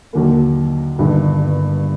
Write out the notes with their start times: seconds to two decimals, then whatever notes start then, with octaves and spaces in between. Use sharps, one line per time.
0.13 D#2 D3 F#3 A#3
0.98 G1 G2 D#3